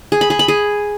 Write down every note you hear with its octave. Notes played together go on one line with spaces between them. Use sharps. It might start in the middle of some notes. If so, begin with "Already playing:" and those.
G#4
B5
G#4
B5
G#4